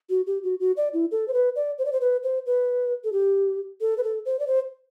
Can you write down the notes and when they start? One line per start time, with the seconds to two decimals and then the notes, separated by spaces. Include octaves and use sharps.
0.10 F#4
0.27 G4
0.43 F#4
0.60 F#4
0.77 D5
0.93 E4
1.11 A4
1.28 C5
1.33 B4
1.56 D5
1.78 C5
1.85 D5
1.92 C5
2.01 B4
2.23 C5
2.46 B4
3.04 A4
3.12 G4
3.81 A4
3.98 B4
4.03 A4
4.25 C5
4.39 D5
4.47 C5